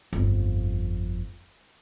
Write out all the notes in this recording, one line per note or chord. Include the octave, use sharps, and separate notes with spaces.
G1 F2